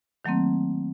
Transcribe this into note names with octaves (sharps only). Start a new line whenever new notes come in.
D#3 F#3 A3 A#3 C4